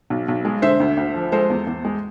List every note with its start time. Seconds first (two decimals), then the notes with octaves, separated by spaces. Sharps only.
0.10 B1
0.28 B1
0.45 G#3
0.62 D3 C5 E5
0.80 D2
0.97 D2
1.14 F3
1.32 G#3 A4 C5
1.50 E2
1.67 E2
1.85 G#3